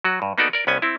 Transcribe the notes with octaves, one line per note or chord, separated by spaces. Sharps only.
F#3 F#4
G2
A#3 B3 D#4 F#4 A4 D5
A#4 D5
C2 B3 C#4 G#5
C4 E4